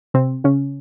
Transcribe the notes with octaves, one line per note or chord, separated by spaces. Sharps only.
C3 C4
C#3 C#4